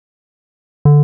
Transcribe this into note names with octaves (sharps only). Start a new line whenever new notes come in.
D3